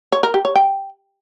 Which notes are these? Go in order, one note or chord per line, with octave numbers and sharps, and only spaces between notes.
C#5
A#4
G4
C#5
G5